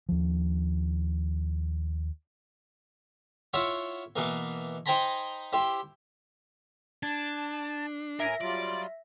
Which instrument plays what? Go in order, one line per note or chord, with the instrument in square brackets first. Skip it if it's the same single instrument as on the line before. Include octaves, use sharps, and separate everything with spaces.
[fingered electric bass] D#2 F3
[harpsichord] E4 F4 C#5 E5 F#5
B2 E3 A#3
D#4 C5 G5 G#5 A#5 B5
E4 G4 C5
[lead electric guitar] D4 [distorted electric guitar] A5 [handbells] G#6
[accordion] A2 G#5 [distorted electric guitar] A#4 [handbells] E5 A#6
[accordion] F#3 G3 F4 [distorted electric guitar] D5